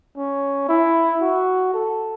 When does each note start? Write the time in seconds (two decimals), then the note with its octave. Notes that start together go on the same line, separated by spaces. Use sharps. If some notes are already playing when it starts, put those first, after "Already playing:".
0.17 C#4
0.69 E4
1.21 F#4
1.74 A4